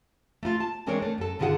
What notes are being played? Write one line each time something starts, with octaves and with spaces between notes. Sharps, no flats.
A3 A#3 D#4 F4
A5
E3 G#3 C4 D4 A#4 C#5
A3
F#2 A4
G2 D3 D#3 F4 G#4 F#5